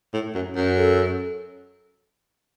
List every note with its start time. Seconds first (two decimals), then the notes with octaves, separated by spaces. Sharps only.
0.13 A2
0.34 F#2
0.56 F#2
0.77 A4